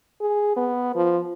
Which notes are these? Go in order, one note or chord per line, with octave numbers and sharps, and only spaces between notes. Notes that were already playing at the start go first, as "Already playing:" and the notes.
G#4
B3
F3